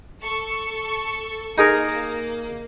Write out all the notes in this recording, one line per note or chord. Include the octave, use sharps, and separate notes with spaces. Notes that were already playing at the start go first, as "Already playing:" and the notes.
A4 C#6
A#3 D#4 G#4 A#4